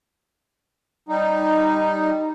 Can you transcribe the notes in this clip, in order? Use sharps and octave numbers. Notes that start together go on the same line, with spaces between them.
G3 D#4